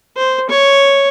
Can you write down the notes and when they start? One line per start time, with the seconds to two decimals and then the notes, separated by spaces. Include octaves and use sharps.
0.17 C5
0.50 C#5